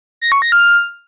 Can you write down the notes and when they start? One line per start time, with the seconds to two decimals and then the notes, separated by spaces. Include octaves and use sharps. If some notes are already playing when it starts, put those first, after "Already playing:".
0.22 A#6
0.32 C#6
0.42 A#6
0.52 F6